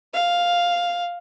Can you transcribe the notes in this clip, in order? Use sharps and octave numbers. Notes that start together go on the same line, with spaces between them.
F5